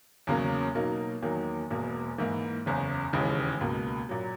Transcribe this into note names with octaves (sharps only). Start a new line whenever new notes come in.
E2 C#3 F#3 A#3 C#4
B2 F#3 A#3 D#4 A#4
E2 D#3 F#3 A#3
E1 E2 B2 A#3
G#2 E3 A#3 E4
F#1 E2 C#3
E1 D#2 C#3 E3 G#3
C#2 B2 A#3
A#2 F#3